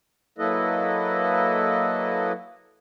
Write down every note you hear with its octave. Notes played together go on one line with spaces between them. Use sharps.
F#3 A#3 E4 A4 B4 D#5